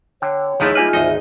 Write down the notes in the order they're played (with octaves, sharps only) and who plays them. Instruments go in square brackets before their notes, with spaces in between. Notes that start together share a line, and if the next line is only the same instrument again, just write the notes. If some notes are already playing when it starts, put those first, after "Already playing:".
[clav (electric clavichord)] D3 [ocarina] C#5 [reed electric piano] G5
[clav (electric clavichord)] D#2 F3 A3 [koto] G#3 D#4 E4
[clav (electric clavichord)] G3 A#3 B4 [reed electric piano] F4 G#5 F6
[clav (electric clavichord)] G#1 D2 D#4 [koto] D#5 [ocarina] E5